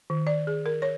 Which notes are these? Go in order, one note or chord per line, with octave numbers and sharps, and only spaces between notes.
D#3
D5
G#4
A#4
C#5